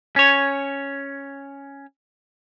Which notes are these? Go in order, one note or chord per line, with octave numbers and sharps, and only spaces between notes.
C#4 C#5